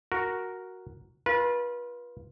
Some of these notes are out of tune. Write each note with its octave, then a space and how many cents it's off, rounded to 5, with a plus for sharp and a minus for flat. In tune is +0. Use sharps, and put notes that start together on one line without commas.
F#4 +0 A#4 +0
F4 +0 B4 -30